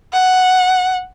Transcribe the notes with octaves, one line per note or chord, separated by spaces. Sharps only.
F#5